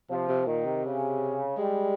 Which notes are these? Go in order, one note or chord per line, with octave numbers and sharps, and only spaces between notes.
C3 F3
C3
A#2 D#3
C3
C#3
G3 G#3